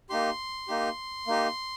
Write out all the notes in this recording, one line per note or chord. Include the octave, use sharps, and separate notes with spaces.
A#3 D#4 G4 C6
A#3 D#4 G4
A#3 D#4 G4